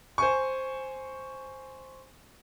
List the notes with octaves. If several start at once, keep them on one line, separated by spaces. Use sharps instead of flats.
C5 G#5 C#6